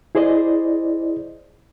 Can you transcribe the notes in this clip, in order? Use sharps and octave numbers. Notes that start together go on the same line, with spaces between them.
E4 G#4 C5 D5 D#5